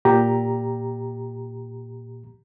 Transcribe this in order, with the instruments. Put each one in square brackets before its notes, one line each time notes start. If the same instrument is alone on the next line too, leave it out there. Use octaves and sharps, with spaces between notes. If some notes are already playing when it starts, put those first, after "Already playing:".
[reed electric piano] A#2 G4 A#5